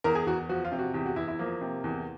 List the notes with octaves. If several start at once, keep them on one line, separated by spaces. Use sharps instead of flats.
E2 A#4
G#4
E2 F#4
F3 F#4
F4
C3
F#4
E2 G4
F#4
E2 E4
E4
F3 A#3
C3
E2